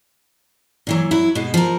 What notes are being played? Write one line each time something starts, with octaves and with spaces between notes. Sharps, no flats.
A#2 E3 F#3
F#3 E4
B2 G#3
F3 A#4